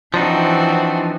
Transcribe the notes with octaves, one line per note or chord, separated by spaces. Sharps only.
E3 F3 C4 D4 D#4 F#4